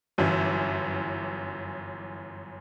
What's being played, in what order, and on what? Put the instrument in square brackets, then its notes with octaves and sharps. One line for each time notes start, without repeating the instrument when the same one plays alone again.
[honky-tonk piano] G1 F#2 E3